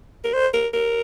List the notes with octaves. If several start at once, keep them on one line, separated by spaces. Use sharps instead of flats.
A#4
C5
A#4
A#4